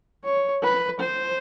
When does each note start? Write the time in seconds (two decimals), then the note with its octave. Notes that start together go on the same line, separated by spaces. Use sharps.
0.25 C#5
0.63 B4
1.00 C5